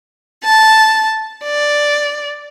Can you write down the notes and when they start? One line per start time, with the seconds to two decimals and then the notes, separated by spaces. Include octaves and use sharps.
0.43 A5
1.43 D5